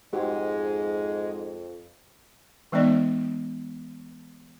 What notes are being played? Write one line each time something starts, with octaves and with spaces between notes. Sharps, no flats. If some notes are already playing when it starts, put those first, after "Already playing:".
F2 G#2 G#3 F#4 G4 C5
E3 G#3 B3 D#4 D5 D#5